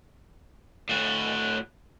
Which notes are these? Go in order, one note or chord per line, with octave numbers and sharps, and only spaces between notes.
A2 F#4